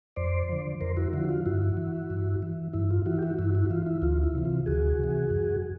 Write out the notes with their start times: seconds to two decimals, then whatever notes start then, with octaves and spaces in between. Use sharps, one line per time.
0.16 F2 C5 D5
0.49 D3 F3
0.81 F2 A#4 C5
0.97 E4 F#4
1.13 D3 F3 E4 F#4
1.29 F4
1.46 G2 E4 F#4
1.77 E3
2.10 G2
2.42 E3
2.73 G2 E4
2.91 F4
3.06 E3 E4 F#4
3.19 G4
3.22 E4 F#4
3.39 G2 E4 F#4
3.55 E4 F#4
3.70 E3 F4
3.86 E4
4.02 D2 F4
4.23 E4
4.35 C3 E3
4.45 F4
4.66 D2 F#4 G#4
4.99 C3 E3
5.31 F#2